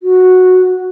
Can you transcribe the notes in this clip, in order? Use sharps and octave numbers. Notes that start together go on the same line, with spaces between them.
F#4